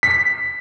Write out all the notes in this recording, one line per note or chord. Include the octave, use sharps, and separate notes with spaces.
B6